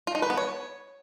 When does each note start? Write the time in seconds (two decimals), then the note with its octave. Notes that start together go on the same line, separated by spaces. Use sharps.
0.07 F4
0.15 D#4
0.22 B4
0.30 B3
0.37 C#5